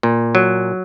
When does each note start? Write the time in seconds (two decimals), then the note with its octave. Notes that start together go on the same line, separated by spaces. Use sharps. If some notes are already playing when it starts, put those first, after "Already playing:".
0.03 A#2
0.35 F#3